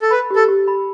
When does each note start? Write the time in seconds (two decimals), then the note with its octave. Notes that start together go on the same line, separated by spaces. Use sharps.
0.02 A4
0.11 B4 B5
0.31 G4
0.36 A4
0.48 G4
0.68 B5